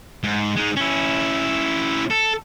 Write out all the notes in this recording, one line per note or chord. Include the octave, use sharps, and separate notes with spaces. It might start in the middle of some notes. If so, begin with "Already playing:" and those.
G#2
G#3 D#4
C#4 E4
A4